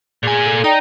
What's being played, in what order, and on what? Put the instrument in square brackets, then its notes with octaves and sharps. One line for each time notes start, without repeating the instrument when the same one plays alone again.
[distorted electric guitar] A#2 G#5 [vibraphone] G#4
[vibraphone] A4
[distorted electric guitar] D#4 [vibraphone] D5 G5 A#5